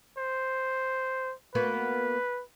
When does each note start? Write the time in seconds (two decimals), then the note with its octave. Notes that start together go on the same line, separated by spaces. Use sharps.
0.18 C5
1.55 A#3 B3 F#4 B4